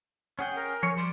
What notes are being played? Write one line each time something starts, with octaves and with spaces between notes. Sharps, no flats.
C#4 G#4 F#5 G5
A#4
F3 G#4 C#5
G3 D5 C6